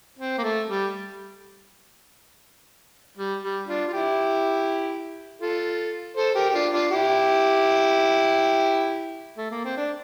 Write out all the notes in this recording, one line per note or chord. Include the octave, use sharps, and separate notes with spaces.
C4
A#3
A3
G3
G3
G3
D4 F4
F4
E4 G4
F4 A4
A4 C5
G4 A#4
G4
D4 F4
D4 F4
E4 G4
A3
A#3
C4
D4